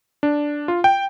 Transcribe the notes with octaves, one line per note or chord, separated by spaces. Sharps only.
D4
F4
G5